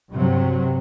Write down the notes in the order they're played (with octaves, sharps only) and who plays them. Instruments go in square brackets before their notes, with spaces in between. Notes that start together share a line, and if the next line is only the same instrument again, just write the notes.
[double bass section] G2 C3 F#3